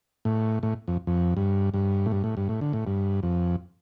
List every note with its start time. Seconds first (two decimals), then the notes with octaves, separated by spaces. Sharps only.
0.25 A2
0.63 A2
0.88 F2
1.07 F2
1.37 G2
1.74 G2
2.06 A2
2.12 G2
2.24 A2
2.37 G2
2.49 A2
2.61 D3
2.73 A2
2.87 G2
3.23 F2